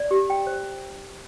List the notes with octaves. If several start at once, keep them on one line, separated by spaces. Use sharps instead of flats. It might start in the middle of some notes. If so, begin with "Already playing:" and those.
Already playing: D5
G4
G5
C5